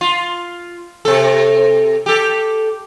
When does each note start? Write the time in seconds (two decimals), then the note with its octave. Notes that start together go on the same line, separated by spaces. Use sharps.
0.01 F4
1.05 C3 A4
2.06 G4 A4